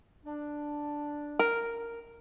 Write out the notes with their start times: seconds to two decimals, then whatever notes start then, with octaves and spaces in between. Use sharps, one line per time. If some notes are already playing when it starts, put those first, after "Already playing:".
0.25 D4
1.39 A#4